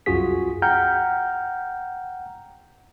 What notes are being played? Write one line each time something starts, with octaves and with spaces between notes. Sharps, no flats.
C2 F#2 F4 F#4 G#4 B6
F#5 G5 A#5 F6 G6